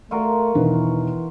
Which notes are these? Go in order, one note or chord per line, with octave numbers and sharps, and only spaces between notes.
A3 F4 F#4 A#4
E1 D#3 E3 B4